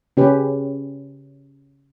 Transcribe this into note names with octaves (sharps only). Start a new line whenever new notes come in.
C#3 C#4 G4 B4